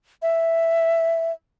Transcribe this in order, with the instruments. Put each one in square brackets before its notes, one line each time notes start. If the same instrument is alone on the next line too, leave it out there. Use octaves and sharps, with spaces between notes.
[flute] E5